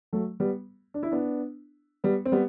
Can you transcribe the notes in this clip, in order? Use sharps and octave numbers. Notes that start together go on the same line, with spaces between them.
F#3 A3
G3 B3
D4
E4
B3 D4
G3 B3
C4
G3 B3